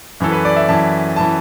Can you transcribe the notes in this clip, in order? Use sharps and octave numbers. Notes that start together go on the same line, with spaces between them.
F#2 E3 A4
B4
D5
E5
F#2 E3 A5
E3 A5